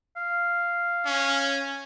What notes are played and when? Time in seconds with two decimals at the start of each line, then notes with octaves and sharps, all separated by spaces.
0.17 F5
1.06 C#4